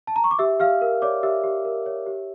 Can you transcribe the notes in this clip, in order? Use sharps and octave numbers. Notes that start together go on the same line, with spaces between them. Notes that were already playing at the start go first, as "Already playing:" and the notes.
A5
A#5
C#6
D6
G4 E5 E6
G4 F5 F6
A#4
C#5 D5 D6
G4 E5 E6
G4
A#4
C#5
G4